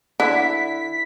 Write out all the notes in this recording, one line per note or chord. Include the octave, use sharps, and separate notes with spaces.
D3 E4 B6